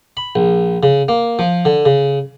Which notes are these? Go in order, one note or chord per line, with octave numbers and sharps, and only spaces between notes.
B5
A#1
C#3
A#3
F3
D3
C#3